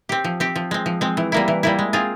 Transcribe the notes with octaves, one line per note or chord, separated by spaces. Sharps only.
C4 G4
F3
C4 G4
F3
G#3 C4
F3
G#3 C4
E3
G3 A#3 E4
E3
G3 A#3 E4
G#3
C4 F4 G#4